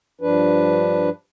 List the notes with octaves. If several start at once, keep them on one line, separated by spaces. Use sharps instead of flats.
G2 F3 D4 B4